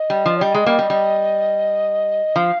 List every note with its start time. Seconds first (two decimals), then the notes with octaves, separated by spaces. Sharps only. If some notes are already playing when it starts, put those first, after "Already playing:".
Already playing: D#5
0.10 G3
0.26 F3
0.37 C#5
0.41 G3 D#5
0.54 G#3
0.66 G3 A#3
0.79 G3
0.90 G3
2.36 F3 F5